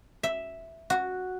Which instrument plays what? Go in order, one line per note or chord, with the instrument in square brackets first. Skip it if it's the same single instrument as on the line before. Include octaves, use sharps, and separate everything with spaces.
[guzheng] E5
F#4